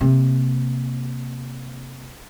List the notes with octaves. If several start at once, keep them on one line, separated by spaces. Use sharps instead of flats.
C3 A#3